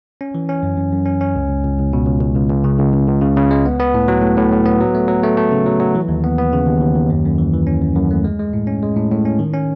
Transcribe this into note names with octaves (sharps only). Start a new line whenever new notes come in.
C#4
E3
C#4
F#2
F#2
F#2
C#4
C#4
C#2
C#2
C#2
C#2
B2
C#2
C#2
C#2
C#2
C#3
C#2
C#2
C#2
C#3
C#3
G#3
B3
B3
A2
F#3
A2
A2
A2
B3
F#3
A3
F#3
A3
A3
C#3
F#3
F#3
E3
D#2
B3
B3
C#3
D#2
D#2
D#2
F#2
F#2
E3
E3
C#4
F#2
F#2
A3
G#3
G#3
A2
C#4
G#3
A2
A2
C#4
D#3
C#4